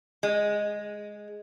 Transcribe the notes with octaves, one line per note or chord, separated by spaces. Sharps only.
G#3